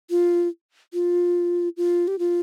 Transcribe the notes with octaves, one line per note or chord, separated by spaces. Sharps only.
F4
F4
F4
G4
F4